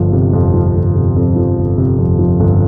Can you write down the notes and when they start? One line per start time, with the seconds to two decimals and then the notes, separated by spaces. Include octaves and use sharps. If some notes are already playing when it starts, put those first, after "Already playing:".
Already playing: G1 F3
0.12 C3
0.33 F2
0.54 F3
0.75 G1
0.95 C3
1.16 F2
1.36 F3
1.57 G1
1.78 C3
1.98 F2
2.19 F3
2.40 G1